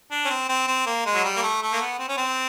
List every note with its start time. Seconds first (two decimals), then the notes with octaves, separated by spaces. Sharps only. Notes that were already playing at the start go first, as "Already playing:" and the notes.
0.11 D4
0.25 C#4
0.30 C4
0.49 C4
0.68 C4
0.86 A#3
1.06 G#3
1.14 F#3
1.24 G3
1.36 A#3
1.43 A3
1.62 A3
1.73 A#3
1.81 B3
1.99 C4
2.09 C#4
2.17 C4